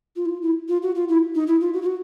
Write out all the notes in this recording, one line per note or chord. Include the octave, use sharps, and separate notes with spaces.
F4
E4
F4
E4
F4
F#4
F4
E4
D#4
E4
F4
F#4
F4
F#4